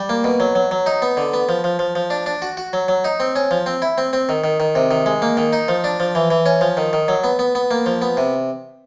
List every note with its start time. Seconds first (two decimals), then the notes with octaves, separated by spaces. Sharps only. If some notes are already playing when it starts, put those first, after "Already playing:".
Already playing: G3
0.09 A#3
0.24 B2
0.40 F#3
0.55 F#3
0.71 F#3
0.86 D#4
1.02 B3
1.17 D3
1.33 B3
1.49 F3
1.64 F3
1.79 F3
1.95 F3
2.10 D4
2.26 D4
2.42 F#4
2.57 F#4
2.73 F#3
2.88 F#3
3.04 D#4
3.20 C4
3.36 C#4
3.51 F3
3.66 C4
3.82 E4
3.98 C4
4.13 C4
4.29 D#3
4.44 D#3
4.60 D#3
4.75 C3
4.91 D#3
5.06 G#3
5.22 A#3
5.37 D#3
5.53 D#4
5.68 F3
5.84 D4
6.00 F3
6.15 E3
6.31 E3
6.46 C#4
6.61 F3
6.77 D#3
6.93 D#3
7.08 F#3
7.24 B3
7.39 B3
7.55 B3
7.71 A#3
7.86 F3
8.02 B3
8.17 C3